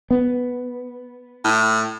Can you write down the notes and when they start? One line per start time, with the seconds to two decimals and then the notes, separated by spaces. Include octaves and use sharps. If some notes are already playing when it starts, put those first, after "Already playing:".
0.11 B3
1.44 A2